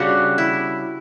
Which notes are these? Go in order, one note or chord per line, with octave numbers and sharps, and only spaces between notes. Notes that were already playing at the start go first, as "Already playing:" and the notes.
Already playing: C#3 G3 D4 F#4
E4